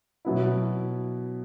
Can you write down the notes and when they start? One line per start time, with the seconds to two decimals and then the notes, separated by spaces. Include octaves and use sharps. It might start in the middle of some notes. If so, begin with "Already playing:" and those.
0.25 B2 F#3 B3 E4